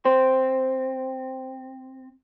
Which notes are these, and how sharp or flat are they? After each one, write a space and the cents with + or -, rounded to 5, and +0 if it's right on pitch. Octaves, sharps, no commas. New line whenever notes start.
C4 +0 C5 +0